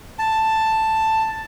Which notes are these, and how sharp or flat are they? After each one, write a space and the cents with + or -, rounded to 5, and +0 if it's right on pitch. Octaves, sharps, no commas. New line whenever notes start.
A5 +5